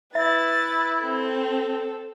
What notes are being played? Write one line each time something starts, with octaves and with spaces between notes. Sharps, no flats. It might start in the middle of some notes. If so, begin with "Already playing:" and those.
E4 B4 E5 A6
C4 A4